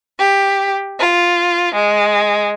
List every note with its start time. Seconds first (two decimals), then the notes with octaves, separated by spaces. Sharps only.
0.19 G4
1.00 F4
1.74 G#3